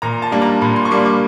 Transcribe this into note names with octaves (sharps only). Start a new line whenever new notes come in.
A#2 A#5
A5
G3 A#3 D4
A#5
A#2 B5
C6
C#6
G3 A#3 D4 D6
D6